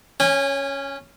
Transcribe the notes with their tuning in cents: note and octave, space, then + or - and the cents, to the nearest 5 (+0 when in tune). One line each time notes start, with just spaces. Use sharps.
C#4 +0 G#5 -30